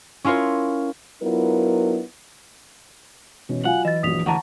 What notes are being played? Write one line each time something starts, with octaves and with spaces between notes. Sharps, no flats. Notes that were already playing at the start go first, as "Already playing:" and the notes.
C#4 E4 F4 A#4 C#5
F#3 B3 D4 E4 F4 A#4
B2 E3 C#4
F#3 F4 F5 F#5 G#5
E3 D#5 A6
A#1 F#3 D#6 B6 F7
D2 E3 F#5 A5 A#5 C#6